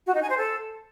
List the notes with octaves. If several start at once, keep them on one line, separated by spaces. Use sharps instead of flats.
F#4
D#4
G#5
C5
A4